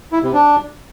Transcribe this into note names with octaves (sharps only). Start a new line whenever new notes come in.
E4
C3
D4